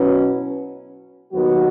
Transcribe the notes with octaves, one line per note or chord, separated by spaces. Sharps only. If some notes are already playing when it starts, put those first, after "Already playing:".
Already playing: B2 F#3 C#4 E4 B4
D#2 D#3 F#3 B3 F#4